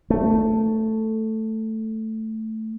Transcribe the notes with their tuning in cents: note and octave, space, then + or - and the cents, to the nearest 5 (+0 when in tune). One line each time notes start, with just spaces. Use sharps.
A3 +5